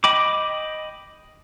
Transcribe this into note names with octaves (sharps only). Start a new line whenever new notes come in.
D#5 G5 B5 D6